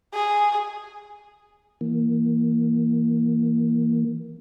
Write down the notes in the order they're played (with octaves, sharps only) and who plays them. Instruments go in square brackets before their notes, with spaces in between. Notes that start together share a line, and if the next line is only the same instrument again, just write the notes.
[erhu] G#4
[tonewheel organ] E3 A#3